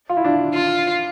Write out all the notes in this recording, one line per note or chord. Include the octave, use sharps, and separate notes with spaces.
F4
E4
D4
F4